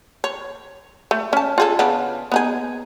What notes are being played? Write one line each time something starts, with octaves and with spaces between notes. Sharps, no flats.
C#5
A3
C#4 A5
F4 G#4 A4
C#3 B3 D4
B3 D#4 G#4